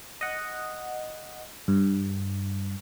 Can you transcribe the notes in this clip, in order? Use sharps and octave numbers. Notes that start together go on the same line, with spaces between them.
D#5 F#5
G2